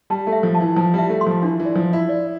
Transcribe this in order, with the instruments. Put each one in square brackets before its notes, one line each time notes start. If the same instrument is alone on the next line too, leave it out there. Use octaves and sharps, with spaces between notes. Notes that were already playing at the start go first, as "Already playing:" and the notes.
[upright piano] G3 [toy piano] A5
[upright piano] A3
[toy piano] E5
[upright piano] F3
[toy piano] A5
[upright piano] E3
[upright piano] F3 [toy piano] A5
[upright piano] G3 [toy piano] E5
[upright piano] A3
[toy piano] C6
[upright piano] F3
[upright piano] E3 [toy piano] D4
[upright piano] E3
[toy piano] D5
[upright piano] F3
[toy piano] D4
[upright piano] E4
[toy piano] D5